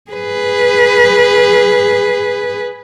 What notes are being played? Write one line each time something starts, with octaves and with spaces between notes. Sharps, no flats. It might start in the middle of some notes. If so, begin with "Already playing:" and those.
G#4 B4